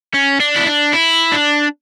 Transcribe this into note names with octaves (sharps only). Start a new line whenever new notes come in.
C#4
D4
E4
D4
E4
D4